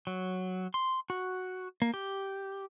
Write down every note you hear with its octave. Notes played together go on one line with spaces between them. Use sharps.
F#3
C6
F#4
A#3
G4